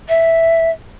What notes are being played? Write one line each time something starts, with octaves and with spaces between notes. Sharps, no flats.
E5